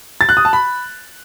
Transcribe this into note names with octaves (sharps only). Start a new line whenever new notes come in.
A6
F#6
D#6
A5
B5